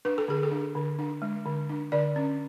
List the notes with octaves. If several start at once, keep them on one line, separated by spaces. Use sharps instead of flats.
D4 B4
A4
D3 G#4
A4
D4
D3
D4
G#3
D3
D4
D3 D5
C#4